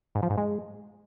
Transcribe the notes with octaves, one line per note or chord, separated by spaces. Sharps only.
G#2
F3
G#2
G#3